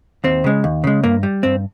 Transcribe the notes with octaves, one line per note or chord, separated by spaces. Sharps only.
D#2 C4
C#3 G#3
D#2
C#3 G#3
G2 A#3
G3
G2 C4